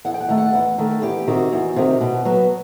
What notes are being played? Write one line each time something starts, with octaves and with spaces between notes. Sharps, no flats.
E2 F#5
G5
F#5
D#3 A3
F#5
E2 F#5
D#3 A3
E2 G4
G4
C3 D#3 F#4
E2
C3 D#3
B2
F#3 B3